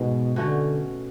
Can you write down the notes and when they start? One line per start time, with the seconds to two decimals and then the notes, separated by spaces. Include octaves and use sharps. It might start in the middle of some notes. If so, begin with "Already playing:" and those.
Already playing: G#2 B2 G#3
0.36 B2 D3 A3 C#4 F#4